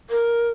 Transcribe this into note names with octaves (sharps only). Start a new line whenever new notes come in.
A#4